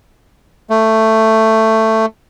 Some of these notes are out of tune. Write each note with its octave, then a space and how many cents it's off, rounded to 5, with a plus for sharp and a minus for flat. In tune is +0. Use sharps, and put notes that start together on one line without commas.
A3 +10